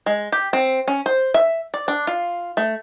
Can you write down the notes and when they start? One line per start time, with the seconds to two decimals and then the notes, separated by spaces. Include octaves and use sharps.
0.06 G#3
0.32 G4
0.53 C4
0.88 C#4
1.06 C5
1.34 E5
1.74 D5
1.88 D4
2.07 F4
2.57 A3